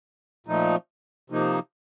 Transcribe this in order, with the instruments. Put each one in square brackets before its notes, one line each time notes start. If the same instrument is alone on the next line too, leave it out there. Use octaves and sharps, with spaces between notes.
[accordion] A#2 F3 A3 D#4
C3 F3 A#3 D#4